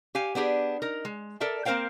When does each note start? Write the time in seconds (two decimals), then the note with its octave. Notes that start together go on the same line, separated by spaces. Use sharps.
0.15 G4 F5 G#5
0.35 B3 D4 G4 G#4
0.82 D#4 A#4
1.05 G#3
1.40 A4 A#4 D5 E5 A5
1.65 A#3 C4 A#4 C5 F5 G5